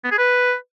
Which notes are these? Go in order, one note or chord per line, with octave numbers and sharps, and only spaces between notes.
B3
G#4
B4